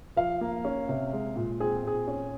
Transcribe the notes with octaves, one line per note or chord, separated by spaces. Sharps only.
F3 F5
A#3
C#4
C3
G#3
A#2
C4 G#4
A#2 G#4
C#4